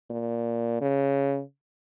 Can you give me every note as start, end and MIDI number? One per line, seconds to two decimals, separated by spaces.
0.10 0.79 46
0.81 1.41 49